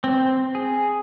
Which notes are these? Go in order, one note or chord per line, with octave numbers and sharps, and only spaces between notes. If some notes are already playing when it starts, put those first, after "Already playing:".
C4
G#4